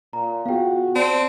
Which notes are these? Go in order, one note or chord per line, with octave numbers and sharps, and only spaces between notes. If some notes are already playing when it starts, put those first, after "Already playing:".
A#2 A#5
B3 F4 F#4 G#4 F5 G5
C4 D5 A5